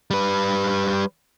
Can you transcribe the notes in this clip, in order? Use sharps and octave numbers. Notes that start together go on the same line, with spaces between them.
G3 B4